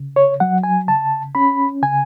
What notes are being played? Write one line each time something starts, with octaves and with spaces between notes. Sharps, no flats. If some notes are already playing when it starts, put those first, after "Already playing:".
Already playing: C#3
C#5
F#3 F#5
G#5
C#3 A5
C#4 B5
C#3 G#5